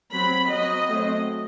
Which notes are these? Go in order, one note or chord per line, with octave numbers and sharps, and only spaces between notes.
F#3 C4 B5
F#3 C4 D#5
F#3 A3 C4